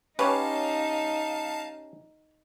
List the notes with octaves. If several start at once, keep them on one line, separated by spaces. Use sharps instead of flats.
C#4 D#4 G4 B4 C#5 F5 A5